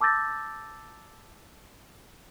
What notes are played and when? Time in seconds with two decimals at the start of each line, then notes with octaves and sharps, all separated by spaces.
0.01 A5 D6 E6 G6 A6 A#6